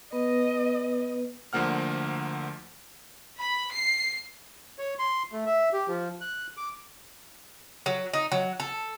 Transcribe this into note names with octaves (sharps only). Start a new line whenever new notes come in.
B3 B4 D#5
D2 D3 F3 A#3 F#5 F6
B5
C7
C#5
C6
A3
E5
G4
F3
F#6
D6
F#3
D#4
F#3
A4